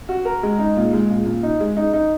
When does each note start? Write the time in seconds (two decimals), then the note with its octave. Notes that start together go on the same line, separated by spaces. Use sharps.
0.09 F#4
0.25 A#4
0.43 G#3
0.59 D#4
0.77 A#2
0.93 G#3
1.10 A#2
1.26 A#2
1.43 D#4
1.60 G#3
1.77 D#4
1.93 D#4